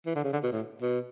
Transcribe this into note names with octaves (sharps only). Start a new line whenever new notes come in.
E3
D3
C#3
D3
B2
A2
B2